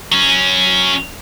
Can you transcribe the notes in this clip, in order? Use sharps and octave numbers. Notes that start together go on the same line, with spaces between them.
F#3 C#4